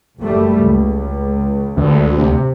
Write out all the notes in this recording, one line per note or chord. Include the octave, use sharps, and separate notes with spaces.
F#1 G3 A3
C#2
D2
C3